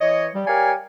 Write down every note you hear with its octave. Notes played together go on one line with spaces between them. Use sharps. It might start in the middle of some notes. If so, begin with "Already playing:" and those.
E3 C#5 D#5
G3
G4 A#4 C#5 D5 F5 G#5